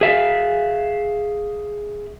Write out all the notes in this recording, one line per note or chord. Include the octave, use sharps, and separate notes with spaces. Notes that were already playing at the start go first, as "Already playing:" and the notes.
G#4 E5 F5